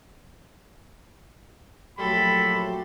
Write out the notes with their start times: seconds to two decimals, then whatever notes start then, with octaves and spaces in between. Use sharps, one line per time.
1.98 A#1 F#3 A3 G4 A4 B5 C6